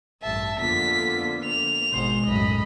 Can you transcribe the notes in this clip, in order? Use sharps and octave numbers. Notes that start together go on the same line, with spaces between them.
A1 G2 E5 A5
F2 D3 A#3 B3 F4 B6
F7
G#1 B2 G#3 C5
B1 F#2 A2 D#5 B5